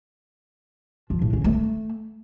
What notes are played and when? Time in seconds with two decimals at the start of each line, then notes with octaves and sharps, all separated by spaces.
1.10 F3
1.22 A2
1.33 C#3
1.44 A3